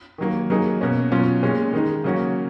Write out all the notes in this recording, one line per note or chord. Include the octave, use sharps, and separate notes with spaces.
D#3 F#3 A#3
F#3 A#3 D#4 G#4
B2 A#3 C#4
B2 F#3 C#4 F4
A#2 G#3 C#4
D#3 G#3 D#4
C#3 F#3 A#3 C#4 F#4